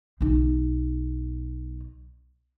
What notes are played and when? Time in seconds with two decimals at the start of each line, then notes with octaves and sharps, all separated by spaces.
0.21 B1 D#4